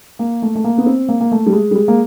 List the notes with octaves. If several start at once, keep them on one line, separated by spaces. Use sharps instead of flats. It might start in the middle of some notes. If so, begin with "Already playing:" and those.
A#3
A3
A3
A#3
B3
C4
A#3
A#3
A3
G3
G#3
G3
G#3
A#3